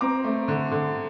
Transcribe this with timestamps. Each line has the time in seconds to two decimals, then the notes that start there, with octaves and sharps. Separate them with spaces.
0.01 C4 A#5 D6
0.24 A3
0.48 D3
0.71 D3